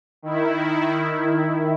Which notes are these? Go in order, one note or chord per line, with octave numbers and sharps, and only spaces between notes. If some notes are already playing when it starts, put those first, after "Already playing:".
D#3 E4